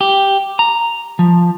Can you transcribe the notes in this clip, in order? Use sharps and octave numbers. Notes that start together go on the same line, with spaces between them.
G4
A#5
F3